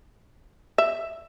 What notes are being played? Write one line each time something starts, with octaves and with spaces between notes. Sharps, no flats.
E5